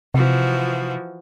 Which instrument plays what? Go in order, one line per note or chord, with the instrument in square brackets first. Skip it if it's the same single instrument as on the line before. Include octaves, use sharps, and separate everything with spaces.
[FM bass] C3 [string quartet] E3 F3 F#4